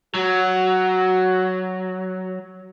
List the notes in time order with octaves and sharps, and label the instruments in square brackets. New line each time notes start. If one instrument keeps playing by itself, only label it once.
[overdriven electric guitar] F#3 [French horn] F#4